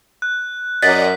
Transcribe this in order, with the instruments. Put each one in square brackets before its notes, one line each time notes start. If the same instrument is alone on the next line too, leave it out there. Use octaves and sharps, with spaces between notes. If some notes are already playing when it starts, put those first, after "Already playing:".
[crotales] F#6
[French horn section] F#2 [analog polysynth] D5 D#5 F#5 [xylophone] A6 [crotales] B6